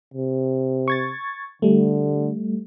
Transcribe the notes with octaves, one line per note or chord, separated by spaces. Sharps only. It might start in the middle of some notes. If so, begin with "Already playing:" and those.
C3
C#6 G#6 A6
D3 G3 A3